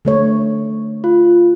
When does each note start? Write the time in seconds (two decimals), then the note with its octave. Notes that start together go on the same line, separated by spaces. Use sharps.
0.05 D3 A3 C#5
1.04 F4